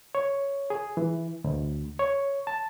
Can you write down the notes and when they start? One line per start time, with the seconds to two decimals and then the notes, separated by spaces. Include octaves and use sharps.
0.15 C#5
0.70 G#4
0.97 E3
1.44 D2
1.99 C#5
2.47 A5